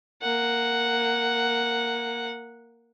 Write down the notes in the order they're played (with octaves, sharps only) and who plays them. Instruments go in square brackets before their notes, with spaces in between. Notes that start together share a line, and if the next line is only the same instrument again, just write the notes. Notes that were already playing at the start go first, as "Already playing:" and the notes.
[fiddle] A#3 F#5